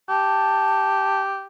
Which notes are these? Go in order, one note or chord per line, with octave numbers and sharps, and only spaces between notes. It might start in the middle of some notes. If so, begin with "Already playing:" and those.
G4 A5